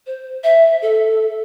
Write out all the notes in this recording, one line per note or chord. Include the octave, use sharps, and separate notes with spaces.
C5
E5
A4